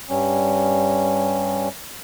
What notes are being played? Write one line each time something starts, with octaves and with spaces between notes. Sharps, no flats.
G2 G3 C#4